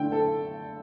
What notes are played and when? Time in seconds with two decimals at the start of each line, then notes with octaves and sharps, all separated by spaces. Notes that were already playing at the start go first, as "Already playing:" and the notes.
Already playing: D3 A3 E4 G5
0.12 A4